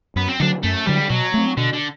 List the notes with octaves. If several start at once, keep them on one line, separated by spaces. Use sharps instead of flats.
F#2 B3
C4
D3 F#3 D4
F#2 A3
D3 F#3 G3
B2 F#3
A3 C4
B2 D3
D3